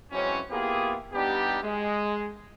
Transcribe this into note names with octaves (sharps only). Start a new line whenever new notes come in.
E3 F#3 G#3 C4 C#4
A#3 B3 E4 F4 G4 G#4
G3 B3 D4 D#4 G4
G#3